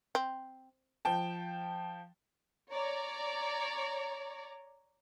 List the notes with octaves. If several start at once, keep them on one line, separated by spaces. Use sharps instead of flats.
C4
F3 G5 A5
C#5 D5 A#5